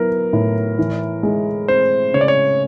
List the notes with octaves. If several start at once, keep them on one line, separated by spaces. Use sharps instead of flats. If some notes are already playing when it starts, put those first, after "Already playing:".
Already playing: F#3 B3 E4 A#4
A2
E3
G#3
C4 C5
C#3 C#5
D5
C#5